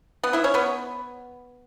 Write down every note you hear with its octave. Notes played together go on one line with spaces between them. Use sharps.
B3 B4
E4 E5
C#4 C#5
B3 B4